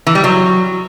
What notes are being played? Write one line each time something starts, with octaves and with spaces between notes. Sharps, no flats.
E3
G3
F#3